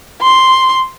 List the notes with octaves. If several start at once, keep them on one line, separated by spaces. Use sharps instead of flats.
C6